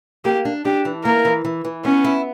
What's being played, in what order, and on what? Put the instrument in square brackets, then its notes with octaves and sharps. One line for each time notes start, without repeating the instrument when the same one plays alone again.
[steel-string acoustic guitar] A#3 [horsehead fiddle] G4
[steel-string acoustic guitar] D4
[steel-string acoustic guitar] D4 [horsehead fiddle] G4
[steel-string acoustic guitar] E3
[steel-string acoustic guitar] A#3 [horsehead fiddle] A#4
[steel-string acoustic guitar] E3
E3
E3
[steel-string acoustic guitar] B3 [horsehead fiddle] C#4
[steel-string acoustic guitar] E4